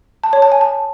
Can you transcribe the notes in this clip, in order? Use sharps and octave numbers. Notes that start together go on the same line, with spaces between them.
A5
C#5
A5
G#5
A5